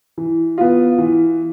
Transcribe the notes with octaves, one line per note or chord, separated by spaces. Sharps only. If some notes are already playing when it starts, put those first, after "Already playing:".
E3
B3 F4
E3